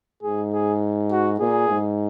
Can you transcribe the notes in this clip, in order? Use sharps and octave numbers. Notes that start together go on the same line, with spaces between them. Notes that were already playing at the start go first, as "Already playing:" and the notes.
G#2 G#4
G#4
F#4
A#2 G#4
G#2